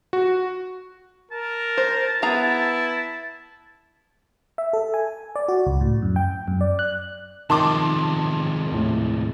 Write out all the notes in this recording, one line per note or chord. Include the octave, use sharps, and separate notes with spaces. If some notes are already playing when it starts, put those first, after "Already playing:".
F#4
A#4 A5
C5
B3 E4 G#4 A#5
E5
A4
G#5
D5
F#4
C#2
A2
F#2
G5
F#2
D5
F#6
C3 D#3 F3 G#3 A5 C6 D6
D#2 A2